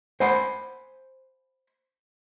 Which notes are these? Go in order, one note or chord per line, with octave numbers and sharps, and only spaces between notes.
C5 F#5 G#5 B5 C6